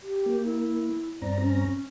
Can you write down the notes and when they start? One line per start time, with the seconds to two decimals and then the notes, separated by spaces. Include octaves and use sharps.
0.01 G4
0.26 A#3
0.45 E4
1.22 G2 C4 D5 A#5
1.41 C#4